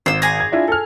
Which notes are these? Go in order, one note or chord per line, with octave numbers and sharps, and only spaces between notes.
G#1 C5 E6
G#4 G#5 A#5
G#6
D4 E4 F4
A4 F6